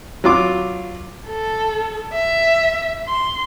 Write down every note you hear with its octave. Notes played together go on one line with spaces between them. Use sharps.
F#3 F4 D6
A4
E5
C6